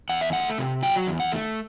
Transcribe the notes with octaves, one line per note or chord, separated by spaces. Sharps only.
E2 F#5
E5
A3 F#5
C3
F#3 G5
E2
F#5
A3